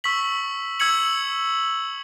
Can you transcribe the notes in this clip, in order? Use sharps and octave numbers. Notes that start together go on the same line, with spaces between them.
C#6 E6 B6 F#7
E6 G#6 C#7 F#7